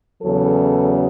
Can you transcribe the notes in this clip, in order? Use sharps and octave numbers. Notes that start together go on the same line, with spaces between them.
E2 C#3 F#3 A4